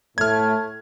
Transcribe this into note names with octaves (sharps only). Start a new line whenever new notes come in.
A2 A3 F6 G#6